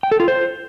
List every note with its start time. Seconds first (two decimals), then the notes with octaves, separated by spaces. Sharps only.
0.03 G5
0.11 A4
0.20 F4
0.28 C5